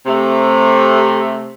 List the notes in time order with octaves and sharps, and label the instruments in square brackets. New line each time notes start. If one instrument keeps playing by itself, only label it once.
[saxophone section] C3 A3